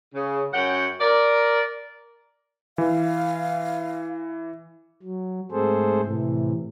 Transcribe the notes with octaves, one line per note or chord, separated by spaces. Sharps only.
C#3
F#2 F#5 G5
A#4 D5
E3 F5
F#3
G#2 A3 C4 G#4 A4 C5
A2 C3 E3